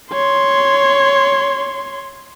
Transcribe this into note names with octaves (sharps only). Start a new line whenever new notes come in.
C#5 C6